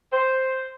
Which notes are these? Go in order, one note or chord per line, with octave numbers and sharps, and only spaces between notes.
C5